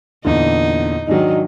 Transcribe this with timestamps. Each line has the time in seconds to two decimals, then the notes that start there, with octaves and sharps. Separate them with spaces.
0.25 E2 A#2 D3 D#4
1.07 G#2 D#3 F#3 D4 D#4